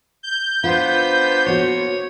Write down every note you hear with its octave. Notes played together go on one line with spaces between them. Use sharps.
G6
B3 D4 F4 C5
A#3 B3 F#4 C#5